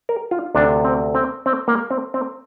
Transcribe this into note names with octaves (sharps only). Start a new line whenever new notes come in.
A#4
F4
D2 C3 D4
C4
C4
C4
A#3
C4
C4